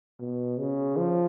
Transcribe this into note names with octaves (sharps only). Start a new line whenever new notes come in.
B2
C#3
F3